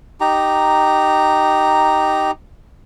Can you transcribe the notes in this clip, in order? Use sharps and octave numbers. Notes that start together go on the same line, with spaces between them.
D#4 G4 A#5